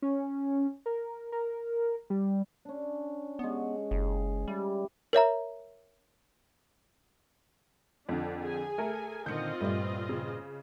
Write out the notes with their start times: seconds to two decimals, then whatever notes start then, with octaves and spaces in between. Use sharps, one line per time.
0.02 C#4
0.86 A#4
1.32 A#4
2.10 G3
2.65 C#4 D4
3.39 G#3 B3 C#6
3.91 F#1 G#4
4.48 G3 E4 G4
5.13 A#4 C#5 E5 A#5
8.09 F2 D3 D4
8.41 G#4 G#5
8.78 A3 A4 A#4
9.26 A#2 D3 D#3 C4 F4 D#5 G6 C#7
9.61 G2 A#2 G3 A3
10.09 C#3